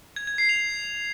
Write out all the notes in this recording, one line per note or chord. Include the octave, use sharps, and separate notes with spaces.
G#6
G#6
C7
F7